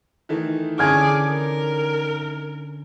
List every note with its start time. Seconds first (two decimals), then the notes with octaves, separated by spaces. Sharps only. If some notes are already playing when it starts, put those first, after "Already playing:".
0.29 D#3 E3 A3
0.79 D3 C#4 G#4 D6 F6 G#6
1.29 A#4